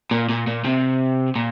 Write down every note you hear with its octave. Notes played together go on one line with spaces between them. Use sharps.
A#2
A#2
A#2
C3
A#2